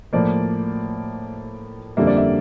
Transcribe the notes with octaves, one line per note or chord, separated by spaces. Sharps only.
A2 F3 A#3 D5
F2 D3 G3 A#3 E5
D5
E5